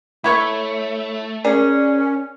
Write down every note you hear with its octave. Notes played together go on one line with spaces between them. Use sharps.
A3 E4 C#5 C#6
C#4 G#4 A#4 D5